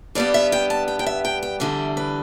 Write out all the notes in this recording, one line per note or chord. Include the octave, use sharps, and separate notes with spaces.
G2 G3 B3 D5
E5
G5
A5
G5
G5
E5
G5
G5
E2 D3 G3 E5
B4